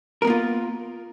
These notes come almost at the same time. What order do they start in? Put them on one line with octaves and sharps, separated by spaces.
A#4 B3 A#3 F4